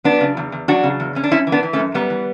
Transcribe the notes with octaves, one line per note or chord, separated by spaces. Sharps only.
F#3 B3 D4
C#3
E2
E2
F#3 D4 F#4
C#3
E2
E2 C#4
D4
F#2 C#4 E4
E3
B3 D4
E3
A3 C#4
F#2
F#2 G3 B3
E3